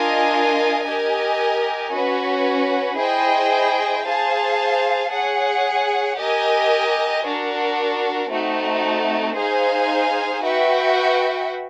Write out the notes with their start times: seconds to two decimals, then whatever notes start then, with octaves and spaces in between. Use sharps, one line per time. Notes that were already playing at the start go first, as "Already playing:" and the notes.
Already playing: D4 F4 A#4 D#5 G#5
0.85 G4 A#4 D#5 G#5
1.92 C#4 F#4 B4
2.98 E4 G#4 C5 D#5 G5
4.05 G#4 C5 F5 A5
5.10 G#4 C#5 F#5
6.17 G4 A#4 D#5 G#5
7.23 D4 F#4 A#4
8.31 A3 C4 D#4 F#4
9.36 D#4 G#4 C5 F5 G#5
10.43 F#4 B4 E5 G5